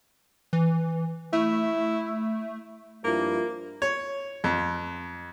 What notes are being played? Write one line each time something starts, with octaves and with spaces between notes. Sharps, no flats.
E3
A3 E4
G2 F3 A#3 E4 F4
C#5
F2